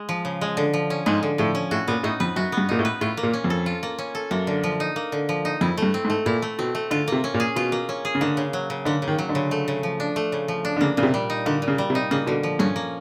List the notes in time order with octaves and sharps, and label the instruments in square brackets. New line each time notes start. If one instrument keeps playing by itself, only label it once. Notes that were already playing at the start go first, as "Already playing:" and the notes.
Already playing: [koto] G#3
F3
C#3
G#3
D3
F3
C#4
[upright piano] G#2 [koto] G#3
[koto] D3
[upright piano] A2 [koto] F3
[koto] C#4
[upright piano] A2 [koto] F#4
[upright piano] A#2 [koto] B3
[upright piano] A2 [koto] D#4
[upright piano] F2 [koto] B4
[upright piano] F#2 [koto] F#4
[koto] B3
[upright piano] G2
[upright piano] A#2 [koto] D#4
[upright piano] A2
[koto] B4
[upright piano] A2 [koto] F4
[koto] A#3
[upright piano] A#2
[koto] C#4
[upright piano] F2
[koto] A4
F4
A#3
C#4
A4
[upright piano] F#2 [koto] A#3
[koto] D3
F3
D#4
A#3
D3
F3
D#4
[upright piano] F2 [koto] E4
[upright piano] G2 [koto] A3
[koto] C4
[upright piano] G#2
[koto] A3
[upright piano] A#2 [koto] E4
[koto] A3
[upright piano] B2 [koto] C4
[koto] A3
[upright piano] D3 [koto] F4
[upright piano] C3 [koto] A#3
[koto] C#4
[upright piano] A#2
[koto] G#4
[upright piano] B2 [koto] F4
[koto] A#3
C#4
G#4
[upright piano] C#3
[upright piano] D3 [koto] A#3
[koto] C#3
F#3
C#3
[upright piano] D3 [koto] A#3
[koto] C#3
[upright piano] D#3
[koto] F#3
[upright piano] D3
[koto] C#3
A3
C#3
F3
D4
A3
C#3
F3
D4
[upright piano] D3
[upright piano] C#3 [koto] A#3
[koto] A#2 [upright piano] C#3
[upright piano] C3
[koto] G3
D#4
[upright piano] D3 [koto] A#3
[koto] A#2
[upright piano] C#3
[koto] G3
[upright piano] C3
[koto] D#4
[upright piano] C#3 [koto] A#3
[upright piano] B2 [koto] D3
[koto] F3
[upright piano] G2 [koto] C#4
[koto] A#3